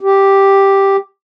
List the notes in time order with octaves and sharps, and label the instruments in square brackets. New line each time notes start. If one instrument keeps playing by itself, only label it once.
[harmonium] G4